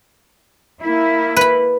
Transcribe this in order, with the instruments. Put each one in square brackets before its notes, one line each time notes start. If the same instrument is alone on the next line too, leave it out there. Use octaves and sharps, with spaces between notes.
[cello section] A#3 E4
[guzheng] B4 B5